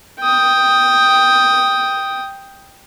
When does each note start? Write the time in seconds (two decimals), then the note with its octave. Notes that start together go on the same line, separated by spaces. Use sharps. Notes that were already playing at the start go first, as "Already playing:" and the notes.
0.20 G5 D#6